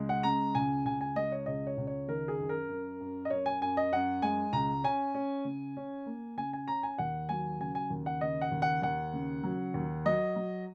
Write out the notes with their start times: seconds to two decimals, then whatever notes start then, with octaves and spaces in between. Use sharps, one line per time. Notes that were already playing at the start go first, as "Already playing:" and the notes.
Already playing: C#2 G#3
0.09 F#5
0.23 C#3 A#5
0.55 C#2 G#5
0.85 C#2 G#5
1.01 G#5
1.15 G#3 D#5
1.32 C#5
1.46 C#2 D#5
1.67 C#5
1.77 C#2
1.87 C#5
2.08 D#3 A#4
2.28 G#4
2.39 F#2
2.49 A#4
2.69 F#2
3.00 F#2
3.25 D#5
3.30 F#2 C#5
3.46 G#5
3.61 F#2 G#5
3.77 D#5
3.92 F#2 F#5
4.22 G#3 G#5
4.53 C#2 A#5
4.84 C#4 G#5
5.14 C#4
5.45 C#3
5.77 C#4
6.06 A#3
6.37 C#3 G#5
6.53 G#5
6.68 C#4 A#5
6.83 G#5
6.98 D#2 F#5
7.29 F#3 G#5
7.60 C#3 G#5
7.75 G#5
7.90 D#2
8.06 F#5
8.21 C#3 D#5
8.41 F#5
8.52 D#2
8.62 F#5
8.82 D#2 F#5
9.13 C#3
9.44 F#3
9.74 D#2
10.05 F#3 D#5
10.36 F#3